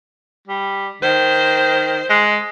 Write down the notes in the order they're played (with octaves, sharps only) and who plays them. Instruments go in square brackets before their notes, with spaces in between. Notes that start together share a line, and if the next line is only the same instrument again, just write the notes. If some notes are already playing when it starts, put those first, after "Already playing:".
[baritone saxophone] G3
[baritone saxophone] D#3 [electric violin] C5
[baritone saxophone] G#3